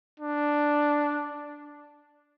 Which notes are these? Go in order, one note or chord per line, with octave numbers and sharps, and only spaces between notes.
D4